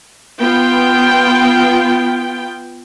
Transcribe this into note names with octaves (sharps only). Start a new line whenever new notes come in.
B3 F4 G5